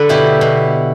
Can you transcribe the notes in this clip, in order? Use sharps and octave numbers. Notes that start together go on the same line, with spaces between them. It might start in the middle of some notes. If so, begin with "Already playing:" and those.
Already playing: D3 A4 B4
B2 E4 G4
B2